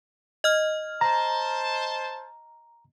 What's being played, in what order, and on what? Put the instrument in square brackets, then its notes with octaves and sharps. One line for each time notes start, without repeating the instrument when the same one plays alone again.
[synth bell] D#5 F6
[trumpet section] C5 A5 [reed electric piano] A#5